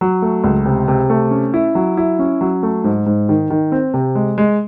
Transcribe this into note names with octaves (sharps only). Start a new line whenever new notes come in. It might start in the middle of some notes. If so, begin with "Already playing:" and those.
F#3
A3
C#2
C3
C3
A3
C#4
E4
F#3
E4
C#4
F#3
A3
G#2
G#2
D#3
D#3
C4
C3
G#3
G#3